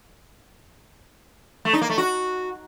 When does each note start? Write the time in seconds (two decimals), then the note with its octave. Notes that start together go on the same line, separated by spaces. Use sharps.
1.65 A3
1.73 D#4
1.81 A#3
1.90 A3
1.98 F#4